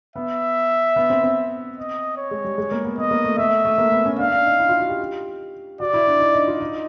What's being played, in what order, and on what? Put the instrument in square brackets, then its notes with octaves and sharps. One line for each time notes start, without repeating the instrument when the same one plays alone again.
[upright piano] B3 [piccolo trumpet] E5
[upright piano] B3
C4
C4
[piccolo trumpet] D#5
C#5
[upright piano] G#3
G3
G#3
A#3
B3
[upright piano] B3 [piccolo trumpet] D#5
[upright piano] A#3
A3
[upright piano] A3 [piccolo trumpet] E5
[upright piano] A3
A#3
B3
C#4
[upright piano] D4 [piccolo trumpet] F5
[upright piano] D4
D#4
E4
F4
F#4
G4
[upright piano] F#4 [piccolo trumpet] D5
[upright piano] E4
D4
D#4
D#4
F4
D#4